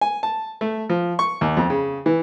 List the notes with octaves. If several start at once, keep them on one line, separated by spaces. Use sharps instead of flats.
G#5
A5
A3
F3
C#6
D#2
F2
C#3
E3